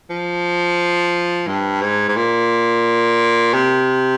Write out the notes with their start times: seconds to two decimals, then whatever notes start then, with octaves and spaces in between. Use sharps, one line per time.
0.10 F3
1.48 G2
1.81 G#2
2.09 G#2
2.16 A#2
3.53 C3